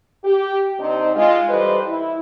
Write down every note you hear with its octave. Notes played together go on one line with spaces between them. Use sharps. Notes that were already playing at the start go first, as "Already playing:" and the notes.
G4
C3 C4 D4 D#4
G#3 F4
E3 G3 A4 B4 C5 D#5
E4